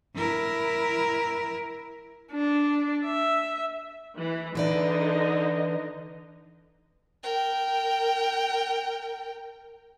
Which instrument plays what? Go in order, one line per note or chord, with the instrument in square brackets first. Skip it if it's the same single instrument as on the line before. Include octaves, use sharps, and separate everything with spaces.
[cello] E4 A#4
[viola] D4
E5
[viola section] E3
[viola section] D3 D#4 D#5 [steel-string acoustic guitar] E3 B4 D5
[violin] A#4 G5